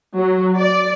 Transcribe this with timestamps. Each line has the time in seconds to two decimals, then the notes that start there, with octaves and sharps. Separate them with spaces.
0.17 F#3
0.58 D5